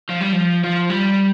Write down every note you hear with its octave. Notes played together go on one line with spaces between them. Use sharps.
F3
G3
F3
F3
G3